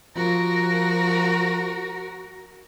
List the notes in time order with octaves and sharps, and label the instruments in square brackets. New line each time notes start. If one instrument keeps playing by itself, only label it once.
[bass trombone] F3 [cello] F#4 A#4